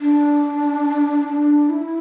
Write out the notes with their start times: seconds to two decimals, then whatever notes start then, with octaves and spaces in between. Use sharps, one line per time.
0.01 D4
1.28 D4
1.70 E4